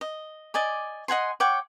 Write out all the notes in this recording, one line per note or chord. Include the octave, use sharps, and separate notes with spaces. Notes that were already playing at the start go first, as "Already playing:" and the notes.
D#5
D5 D#5 G#5 D6
D#5 F#5 G#5 C6
C#5 F#5 G5 D6